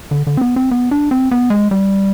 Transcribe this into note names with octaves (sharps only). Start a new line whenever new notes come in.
D3
D3
C4
B3
C4
B3
D4
C4
B3
G#3
G3